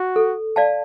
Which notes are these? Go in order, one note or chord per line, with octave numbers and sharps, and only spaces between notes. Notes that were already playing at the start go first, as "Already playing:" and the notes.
Already playing: F#4
A4
D5 F5 A5